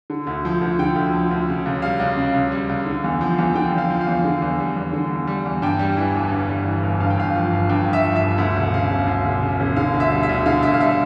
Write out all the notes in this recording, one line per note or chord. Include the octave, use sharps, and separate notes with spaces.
D3
D2
F3
D2
D3 G5
D2
F3
D2
C#3
C#2
G3 F5
C#2
C#3
C#2
G3
C#2
D3
E2
F3
E2
D3 G5
E2
F5
F3
F5
E2
D3
E2
G3
E2
D3
E2
G3
E2
G2 G5
G3
E3
G1
G2
G3
E3
G1
G2 F5
G5
G1 F5
F3
G1
G2 G5
G1
E5
F3
E5
G1
D2 E5
E1
C#3 F5
E1
D2
E1
C#3
E1
D3 F5
D2
E5
G3
E5
D2
D3 F5
D2 E5
F5
G3 E5